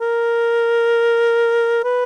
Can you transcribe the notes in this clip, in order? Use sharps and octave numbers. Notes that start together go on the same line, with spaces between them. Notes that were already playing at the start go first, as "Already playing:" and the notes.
A#4
B4